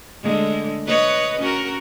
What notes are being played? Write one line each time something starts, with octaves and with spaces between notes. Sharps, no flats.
D3 G#3 A3
B4 C#5 D#5
C#4 F#4 A#4